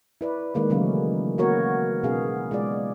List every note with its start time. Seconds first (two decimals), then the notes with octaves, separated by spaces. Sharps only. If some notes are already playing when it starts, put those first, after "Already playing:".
0.21 E4 B4 D5
0.55 D#3 G#3 A#3 B4
0.70 C#3 E3 F#3 A3 C#4
1.38 A#3 B3 F#4 A#4 C#5
2.03 B2 B3 C#4 D#4 G#4 F5
2.51 G#3 F4 G#4 D5